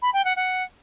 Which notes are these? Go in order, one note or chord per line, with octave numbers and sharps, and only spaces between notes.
B5
G5
F#5
F#5